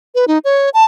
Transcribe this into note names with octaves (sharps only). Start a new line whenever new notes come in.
B4
D#4
C#5
A5